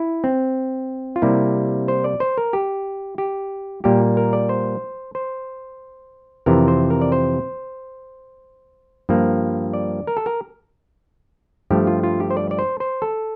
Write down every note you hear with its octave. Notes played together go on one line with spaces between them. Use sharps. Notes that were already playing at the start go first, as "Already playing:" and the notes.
Already playing: E4
C4
F4
C3 G3 A#3 E4
C5
D5
C5
A#4
G4
G4
A#2 G3 A#3 G4
A#4
D5
C5
C5
F2 C3 E3 A#4
C5
A#4
D5
C5
G2 F3 A#3
D5
A#4
A4
A#4
G2 F3 A3 G4
F4
F4
G4
C5
D5
D5
C5
C5
A4